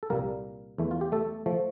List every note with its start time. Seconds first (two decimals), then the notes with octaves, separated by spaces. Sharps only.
0.03 A4
0.10 C2 A#2 G3 A#3 A#4
0.78 E2 E3 A3
0.91 F4
1.01 G4
1.12 A3 A4
1.46 F3 A3